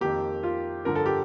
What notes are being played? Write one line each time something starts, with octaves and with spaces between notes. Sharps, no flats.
F2 D#3 A#3 G4
F4
G2 D3 F3 A#4
A4
G4